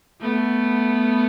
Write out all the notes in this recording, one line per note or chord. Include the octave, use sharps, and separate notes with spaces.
A3 B3